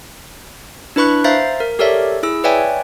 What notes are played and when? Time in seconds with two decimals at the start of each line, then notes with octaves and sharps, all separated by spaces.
0.96 D4 E4 B4 B5 C#6 F#6
1.24 C5 E5 F5 A#5 A6 C7
1.60 A#4
1.79 G4 A4 A#4 C#5 D5 E5
2.23 E4 G#4 E6
2.44 B4 C#5 D5 E5 G5 G#5